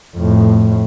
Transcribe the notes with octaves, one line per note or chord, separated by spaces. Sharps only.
F2 A2